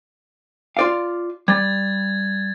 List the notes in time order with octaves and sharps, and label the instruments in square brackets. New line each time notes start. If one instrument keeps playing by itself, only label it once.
[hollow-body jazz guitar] F4 D5 F5
[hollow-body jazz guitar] G3 [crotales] G#6 A6